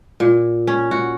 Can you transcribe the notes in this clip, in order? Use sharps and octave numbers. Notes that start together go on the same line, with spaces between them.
A#2
C#4
F#4